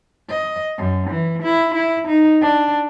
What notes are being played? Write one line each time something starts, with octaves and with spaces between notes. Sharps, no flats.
D#5
F#2
E3
E4
E4
D#4
D4